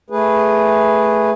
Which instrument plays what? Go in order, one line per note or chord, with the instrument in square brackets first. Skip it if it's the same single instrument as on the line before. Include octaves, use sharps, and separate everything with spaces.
[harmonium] A3 G#4 B4